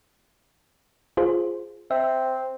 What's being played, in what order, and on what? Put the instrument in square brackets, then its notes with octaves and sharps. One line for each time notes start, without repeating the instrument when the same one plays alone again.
[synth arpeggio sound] F4 G#4 C5
[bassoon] C4 [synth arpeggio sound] E5